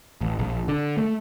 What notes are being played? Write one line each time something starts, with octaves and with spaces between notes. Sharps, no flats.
A1
A#1
D3
A3